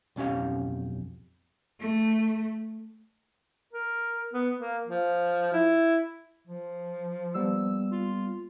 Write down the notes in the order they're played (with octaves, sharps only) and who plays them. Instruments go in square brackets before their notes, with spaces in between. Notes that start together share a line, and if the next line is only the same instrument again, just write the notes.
[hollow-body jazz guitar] B1 F2 C#4 G4 F5
[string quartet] A3
[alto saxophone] A#4
B3
A#3
F3
E4
[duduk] F3
[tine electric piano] G3 A#3 B3 [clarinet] E6
[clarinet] F4